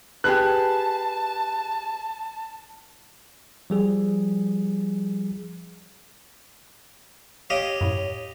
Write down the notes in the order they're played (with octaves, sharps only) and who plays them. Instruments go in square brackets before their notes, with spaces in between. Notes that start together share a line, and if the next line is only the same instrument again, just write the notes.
[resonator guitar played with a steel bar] G4 G#4 B4 [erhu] A5 [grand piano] F#6
[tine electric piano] F3 G3 G#4
[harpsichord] G4 D#5 F5 [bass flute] C#5
[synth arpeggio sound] F#2 A2